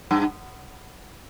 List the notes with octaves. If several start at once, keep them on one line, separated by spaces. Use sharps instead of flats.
G2